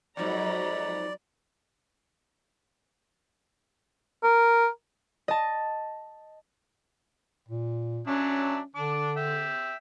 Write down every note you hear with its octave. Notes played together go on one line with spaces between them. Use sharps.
F2 G#2 F#3 D5 A#5 B5
A#4
D#5 A5
A#2
F#3 C#4 D4 E5
D3 D4 D6
E5 G5